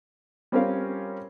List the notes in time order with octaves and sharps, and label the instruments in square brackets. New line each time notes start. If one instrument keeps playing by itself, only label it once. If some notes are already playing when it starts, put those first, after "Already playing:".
[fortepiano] G3 C4 C#4 F4 A#4 F5